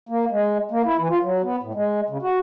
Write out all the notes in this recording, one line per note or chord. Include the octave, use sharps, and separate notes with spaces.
A#3
G#3
A#3
E4
E3
F4
F#3
B3
A2
G#3
C#3
F#4